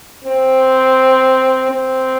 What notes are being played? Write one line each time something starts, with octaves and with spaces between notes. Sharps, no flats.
C4
C4